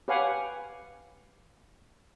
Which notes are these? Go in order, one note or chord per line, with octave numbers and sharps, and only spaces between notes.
G4 B4 C#5 F5 F#5 G#5